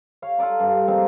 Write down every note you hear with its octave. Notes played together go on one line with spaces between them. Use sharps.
C#5 F5
F4 A4 D5 A#5
G2 D4
F3 G#3 A#3 C4